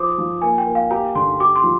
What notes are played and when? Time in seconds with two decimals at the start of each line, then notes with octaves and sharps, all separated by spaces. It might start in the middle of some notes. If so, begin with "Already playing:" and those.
Already playing: F3 C5 D6 D#6
0.18 F3
0.42 A#3 G#5
0.58 G5
0.67 A#3
0.75 F5
0.91 G4 A#5
1.15 D3 C6
1.40 G4 D6
1.56 C6
1.64 F3